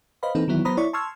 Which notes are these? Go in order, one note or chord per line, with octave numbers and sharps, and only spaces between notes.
B4 C5 D#5 F5 B5
E3 A#3 C4 D#4 A4 B4
D#3 E3 F#3 B3 E4
F#3 B3 C5 A#5 B5 D#6
E4 C#5 D5 C#6
A5 C6 C#6 E6 F6 G#6